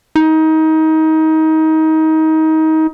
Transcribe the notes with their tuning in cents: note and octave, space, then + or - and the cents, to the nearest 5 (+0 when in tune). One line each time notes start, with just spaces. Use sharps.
D#4 +25